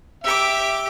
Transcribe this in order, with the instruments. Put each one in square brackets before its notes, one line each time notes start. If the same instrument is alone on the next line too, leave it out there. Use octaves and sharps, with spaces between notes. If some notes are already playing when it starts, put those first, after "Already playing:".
[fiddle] G4 D6 [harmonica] E5